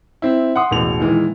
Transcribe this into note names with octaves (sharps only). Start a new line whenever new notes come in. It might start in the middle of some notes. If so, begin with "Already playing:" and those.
C4 E4
F#5 C6 D#6
E1 A1 B2 F7
A#2 D#3 E3 G#3